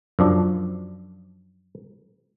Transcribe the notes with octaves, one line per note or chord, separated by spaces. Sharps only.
F#2 F3 D4